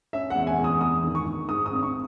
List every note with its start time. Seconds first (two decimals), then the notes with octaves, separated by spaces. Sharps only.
0.13 C#4 E5
0.30 F#5
0.35 E2
0.47 G#5
0.58 E2
0.64 D#6
0.81 E2 D#6
1.04 D#3
1.15 C#6
1.26 D#3
1.49 G#2 D#6
1.66 D#6
1.72 G#1
1.83 C#6